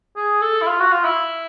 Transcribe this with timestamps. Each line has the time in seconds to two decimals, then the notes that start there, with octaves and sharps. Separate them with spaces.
0.17 G#4
0.42 A4
0.62 E4
0.67 F4
0.80 F#4
0.91 F4
1.05 E4